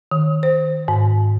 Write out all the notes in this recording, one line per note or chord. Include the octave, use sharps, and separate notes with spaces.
D#3
C5
G#2